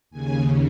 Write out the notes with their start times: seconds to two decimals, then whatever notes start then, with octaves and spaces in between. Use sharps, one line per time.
0.10 D#2 C#3 G#5